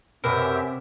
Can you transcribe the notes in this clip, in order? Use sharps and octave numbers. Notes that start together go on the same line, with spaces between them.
F#2 C3 G4 A#4 B4 E5